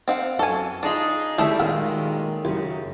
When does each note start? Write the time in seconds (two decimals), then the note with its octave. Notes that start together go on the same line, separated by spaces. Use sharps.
0.08 C4 F5 F#5
0.39 F#2 A4 G#5 C#6
0.83 D4 D#4 F4 G#4 D6
1.38 D#3 G3 A3 C#4 E4 G#4
1.60 A#2 D#3 F#3 G#3 E5 F5 G5
2.45 C2 F#2 C#3